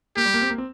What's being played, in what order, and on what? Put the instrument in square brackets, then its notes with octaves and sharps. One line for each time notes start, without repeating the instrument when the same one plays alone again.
[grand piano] A#3 [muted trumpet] G4
[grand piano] G3
A#3
C4
A#3
C4